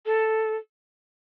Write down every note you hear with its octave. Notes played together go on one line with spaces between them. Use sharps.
A4